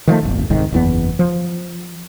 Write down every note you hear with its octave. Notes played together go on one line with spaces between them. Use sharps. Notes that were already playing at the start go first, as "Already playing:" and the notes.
D#3 F3 F#3 A3
D1 G1
E1 C2 G#2 D#3
F#1 E2 B3
F3